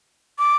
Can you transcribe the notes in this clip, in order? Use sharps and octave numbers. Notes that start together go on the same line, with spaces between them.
D6